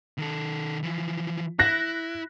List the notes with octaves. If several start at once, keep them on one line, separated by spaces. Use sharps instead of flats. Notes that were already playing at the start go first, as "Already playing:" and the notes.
D#3 A4
E3 F3
E4 F#6 A#6